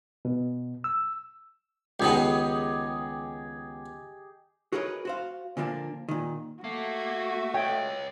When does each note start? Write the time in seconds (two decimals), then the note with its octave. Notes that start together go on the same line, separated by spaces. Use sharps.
0.25 B2
0.84 E6
2.00 C#2 D#3 B3 G4 G#4 D#5
4.72 F#4 G#4 A#4 B4 C#5 D#5
5.05 F#4 C5 F5
5.57 A#2 D3 F3 A#3 D4
6.08 A#2 D#3
6.64 A3 A#3 F#4
7.54 C#5 D#5 G5